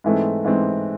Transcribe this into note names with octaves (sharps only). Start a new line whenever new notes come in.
G#2 E3 A3 C4
G#2 E3 A3 C4